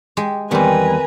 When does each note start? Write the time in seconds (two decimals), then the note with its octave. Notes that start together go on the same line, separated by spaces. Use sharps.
0.17 G#3 G4
0.51 E2 D#3 G3 B3 C4 B4 G#5 A#5